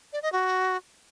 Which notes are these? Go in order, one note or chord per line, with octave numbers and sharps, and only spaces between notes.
D5
D#5
F#4